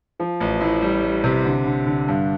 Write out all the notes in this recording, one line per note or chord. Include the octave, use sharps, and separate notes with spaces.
F3
A1
A2
G3
G3
C3
D3
D3
D3
G2